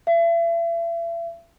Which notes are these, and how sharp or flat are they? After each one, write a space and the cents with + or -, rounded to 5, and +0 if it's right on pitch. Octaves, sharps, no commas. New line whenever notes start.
E5 +40